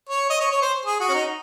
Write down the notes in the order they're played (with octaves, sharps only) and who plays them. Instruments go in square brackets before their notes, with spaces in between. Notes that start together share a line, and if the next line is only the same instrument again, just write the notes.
[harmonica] C#5
D#5
C#5
C#5
C5
G#4
F#4
C#4
D#4